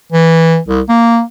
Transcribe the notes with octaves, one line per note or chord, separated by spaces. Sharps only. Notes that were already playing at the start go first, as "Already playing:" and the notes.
E3
C2
A#3